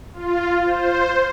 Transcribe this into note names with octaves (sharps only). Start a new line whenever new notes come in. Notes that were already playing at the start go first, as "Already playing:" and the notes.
F4
C5